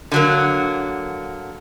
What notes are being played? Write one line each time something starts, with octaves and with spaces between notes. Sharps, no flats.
D3 F#3 A#3